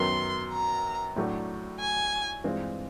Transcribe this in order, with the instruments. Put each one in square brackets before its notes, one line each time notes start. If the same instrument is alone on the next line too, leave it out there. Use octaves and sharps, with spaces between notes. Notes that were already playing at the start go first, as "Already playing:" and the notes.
Already playing: [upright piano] F#2 D#3 F#3 B3 [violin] C6
[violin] A#5
[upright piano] A2 F#3 A3 D4 F#4
[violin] G#5
[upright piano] G2 E3 G#3 C4 F4